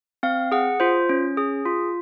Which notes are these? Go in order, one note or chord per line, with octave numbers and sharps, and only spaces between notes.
C4 F5
G#4 F#5
F4 C5
C#4
G#4
F4